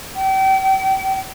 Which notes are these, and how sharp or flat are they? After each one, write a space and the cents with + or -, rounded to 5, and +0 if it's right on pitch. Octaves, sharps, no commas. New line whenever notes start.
G5 -35